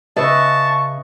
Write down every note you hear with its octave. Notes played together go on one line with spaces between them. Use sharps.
C#3 B4 D#5 E5 A5 C#6